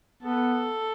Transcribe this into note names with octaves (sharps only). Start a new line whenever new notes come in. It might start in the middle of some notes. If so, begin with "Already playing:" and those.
B3 A4